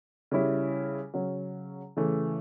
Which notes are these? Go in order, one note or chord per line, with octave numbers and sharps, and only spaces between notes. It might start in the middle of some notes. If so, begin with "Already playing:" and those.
C#3 G3 C#4 E4
C#3 F#3 C#4
C#3 E3 A3